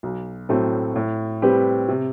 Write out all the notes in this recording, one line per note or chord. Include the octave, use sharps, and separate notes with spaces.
B1
A2 F#3 A3 C4
A2
G3 C4 G4 B4
C3